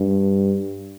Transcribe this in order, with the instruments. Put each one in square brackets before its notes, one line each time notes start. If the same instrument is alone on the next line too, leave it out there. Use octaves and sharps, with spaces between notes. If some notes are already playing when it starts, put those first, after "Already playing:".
Already playing: [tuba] G2